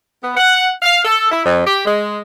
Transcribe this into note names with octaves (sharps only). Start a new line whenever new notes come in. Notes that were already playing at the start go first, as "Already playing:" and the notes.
B3
F#5
F5
A4
E4
F2
G4
G#3